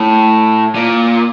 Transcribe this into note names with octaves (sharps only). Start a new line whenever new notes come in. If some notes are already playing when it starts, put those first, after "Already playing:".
Already playing: A2
A#2